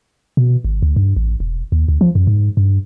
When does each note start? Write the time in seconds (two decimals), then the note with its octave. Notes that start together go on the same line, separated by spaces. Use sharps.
0.37 B2
0.64 G#1
0.82 D2
0.96 G2
1.16 A1
1.40 E1
1.72 D#2
1.88 D2
2.01 F3
2.15 F#2
2.27 G#2
2.57 G2